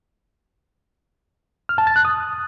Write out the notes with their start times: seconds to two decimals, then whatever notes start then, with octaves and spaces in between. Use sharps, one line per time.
1.69 F6
1.78 A5
1.87 A6
1.96 F#6
2.05 D#6